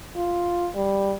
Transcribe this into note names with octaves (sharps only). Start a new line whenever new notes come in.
F4
G3